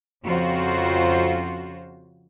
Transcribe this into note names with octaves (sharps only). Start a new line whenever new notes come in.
F2 C#3 F4 F#4 C5